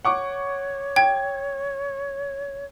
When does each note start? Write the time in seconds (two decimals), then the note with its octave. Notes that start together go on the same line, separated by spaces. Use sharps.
0.05 C#5 F#5 C#6 D6
0.96 G5 G#6